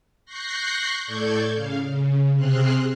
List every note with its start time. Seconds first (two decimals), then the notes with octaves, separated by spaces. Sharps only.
0.25 C#6 F#6 G6 A#6 C7
1.04 A2 A4 D5 C#6 G6 G#6
1.53 C#3 F5
1.88 C#3
2.35 C3 C4 G#4 C6 F6 F#6